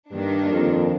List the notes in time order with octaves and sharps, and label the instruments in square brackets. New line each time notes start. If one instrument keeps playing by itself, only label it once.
[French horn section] G2 [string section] D#3 A#3 D4
[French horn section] F2